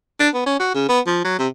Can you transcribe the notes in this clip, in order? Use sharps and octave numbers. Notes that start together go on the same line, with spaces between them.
D4
B3
C#4
F#4
C#3
B3
F3
F#3
C3